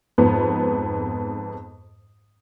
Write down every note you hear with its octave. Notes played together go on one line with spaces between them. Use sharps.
F2 G#2 B3